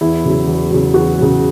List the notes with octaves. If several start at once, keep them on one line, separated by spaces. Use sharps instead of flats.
E2 E4
C#3 F#3
E2
C#3 F#3
E2 F#4
C#3 F#3